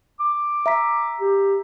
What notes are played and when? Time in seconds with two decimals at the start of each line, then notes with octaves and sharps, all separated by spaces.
0.20 D6
0.66 E5 A#5 B6
1.20 G4